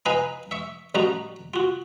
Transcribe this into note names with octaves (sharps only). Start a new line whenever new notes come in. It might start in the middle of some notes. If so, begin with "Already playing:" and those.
D#4 E4 B4 F5 G#5 A#5
E5 C#6
A1 G3 D#4 F#4 A#5
F4 F#4